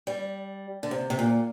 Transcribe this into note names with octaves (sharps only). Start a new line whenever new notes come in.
G3
D3
C3
C3
A#2